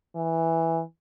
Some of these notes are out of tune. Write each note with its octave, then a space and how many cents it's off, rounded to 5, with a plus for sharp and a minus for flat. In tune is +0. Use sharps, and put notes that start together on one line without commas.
E3 -5